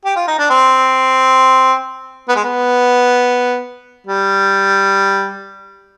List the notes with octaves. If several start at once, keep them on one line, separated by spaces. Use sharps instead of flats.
G4
F4
D#4
D4
C4
B3
G#3
B3
G3